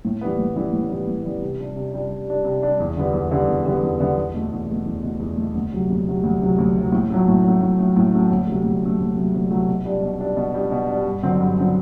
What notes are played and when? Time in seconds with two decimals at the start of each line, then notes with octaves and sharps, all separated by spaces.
0.05 A2
0.21 E3 G3 B3
0.39 A2
0.56 E3 G3 B3
0.73 A2
0.90 E3 G3 B3
1.07 A2
1.25 E3 G3 B3
1.41 C3
1.60 G3 D4
1.76 C3
1.93 G3 D4
2.10 C3
2.28 G3 D4
2.44 C3
2.62 G3 D4
2.80 E2
2.97 D3 G3 B3
3.13 E2
3.31 D3 G3 B3
3.48 E2
3.66 D3 G3 B3
3.83 E2
4.00 D3 G3 B3
4.17 E2
4.34 B2 A3
4.52 E2
4.69 B2 A3
4.86 E2
5.03 B2 A3
5.20 E2
5.37 B2 A3
5.55 D2
5.73 C3 F#3
5.90 D2
6.07 C3 F#3
6.24 D2
6.41 C3 F#3
6.58 D2
6.76 C3 F#3
6.92 A2
7.10 F#3 A3
7.28 A2
7.44 F#3 A3
7.61 A2
7.78 F#3 A3
7.96 A2
8.14 F#3 A3
8.31 D2
8.47 C3 F#3 A3
8.64 D2
8.82 C3 F#3 A3
8.99 D2
9.17 C3 F#3 A3
9.34 D2
9.51 C3 F#3 A3
9.68 B2
9.85 G3 D4
10.02 B2
10.20 G3 D4
10.37 B2
10.54 G3 D4
10.71 B2
10.89 G3 D4
11.06 G2
11.23 D3 F#3 C4
11.41 G2
11.58 D3 F#3 C4